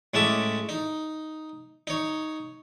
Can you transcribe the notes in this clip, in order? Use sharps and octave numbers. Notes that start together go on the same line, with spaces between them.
A2 G#3 C#4 E5 A5 D6
D#4
D#4 C#5